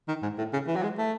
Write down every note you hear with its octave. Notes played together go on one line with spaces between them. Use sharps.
D#3
G#2
A2
C#3
E3
F#3
G#3
A3